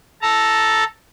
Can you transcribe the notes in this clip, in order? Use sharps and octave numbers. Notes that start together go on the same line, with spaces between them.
A4 A5 A#5